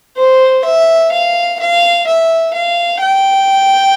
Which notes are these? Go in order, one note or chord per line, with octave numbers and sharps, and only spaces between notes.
C5
E5
F5
F5
E5
F5
G5